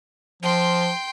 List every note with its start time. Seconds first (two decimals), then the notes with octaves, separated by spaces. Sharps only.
0.42 F3 G5 C6